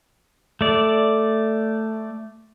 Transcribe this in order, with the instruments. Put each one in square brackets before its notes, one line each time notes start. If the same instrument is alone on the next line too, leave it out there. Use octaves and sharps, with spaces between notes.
[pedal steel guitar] A3 D5